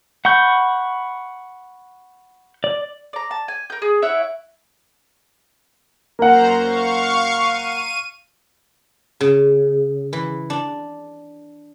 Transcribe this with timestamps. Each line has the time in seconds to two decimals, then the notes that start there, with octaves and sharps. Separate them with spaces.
0.25 F#5 B5 C#6 G6
2.64 D5
3.13 D5 A#5
3.31 A5
3.48 G#5
3.70 A#4 G6
3.82 G#4
4.02 E4 C#5 E5 F#5
6.19 F#2 A#3 C5 F#5 A#5
6.61 F5 C#6
7.39 D#7
9.21 C#3
10.13 E3
10.50 D4